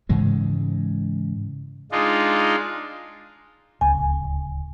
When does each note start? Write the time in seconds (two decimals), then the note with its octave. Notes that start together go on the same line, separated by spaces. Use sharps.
0.09 G#2 C#3 E3 G#3
1.92 G#3 D4 D#4 F4
3.81 D1 C#2 G#5